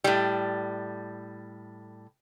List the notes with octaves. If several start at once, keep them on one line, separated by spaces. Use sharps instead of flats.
A2 G3